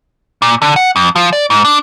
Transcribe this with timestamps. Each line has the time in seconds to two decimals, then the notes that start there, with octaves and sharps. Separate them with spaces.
0.42 A#2
0.62 D3
0.76 F#5
0.96 F2
1.16 F3
1.33 D5
1.50 G#2
1.65 D4